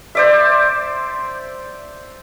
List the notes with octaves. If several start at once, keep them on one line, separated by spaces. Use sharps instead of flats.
C5 D5 E5